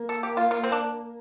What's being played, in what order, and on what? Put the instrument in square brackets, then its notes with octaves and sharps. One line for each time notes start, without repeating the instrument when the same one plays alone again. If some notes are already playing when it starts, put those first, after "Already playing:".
Already playing: [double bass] A#3
[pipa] A4
G4
F4
F4
C4
D4